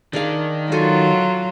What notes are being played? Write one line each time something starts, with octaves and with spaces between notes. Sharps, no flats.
D#3 D4 G#4 F5
F#3 F4 F#4 A4 G#5